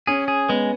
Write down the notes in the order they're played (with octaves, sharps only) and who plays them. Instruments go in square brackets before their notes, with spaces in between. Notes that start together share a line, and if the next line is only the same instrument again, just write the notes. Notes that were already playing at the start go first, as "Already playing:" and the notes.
[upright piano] C#4 [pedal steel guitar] G#4
[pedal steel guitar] G#4
[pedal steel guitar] G#3 [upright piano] B3